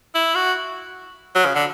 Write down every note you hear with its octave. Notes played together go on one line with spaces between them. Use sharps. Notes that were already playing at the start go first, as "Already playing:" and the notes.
E4
F#4
F#3
C#3
D3